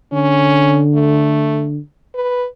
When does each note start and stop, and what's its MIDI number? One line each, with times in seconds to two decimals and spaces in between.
0.13 1.79 50
0.13 0.82 61
0.95 1.67 57
2.15 2.46 71